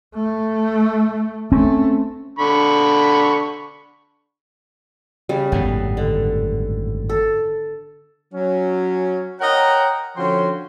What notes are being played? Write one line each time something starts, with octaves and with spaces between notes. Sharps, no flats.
A3
A3 C4 C#4
D3 B5 C#6
C#3 G3
G#1 F#2 A2 B3
D3
A4
F#3 C#4
A#4 C#5 D#5 F#5 G5 A#5
D3 F3 C#4 F#4 G5 C6